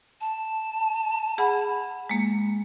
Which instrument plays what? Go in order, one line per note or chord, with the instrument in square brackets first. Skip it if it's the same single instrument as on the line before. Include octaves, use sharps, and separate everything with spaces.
[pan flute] A5
[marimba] G#4 F#5 B5
G#3 A#3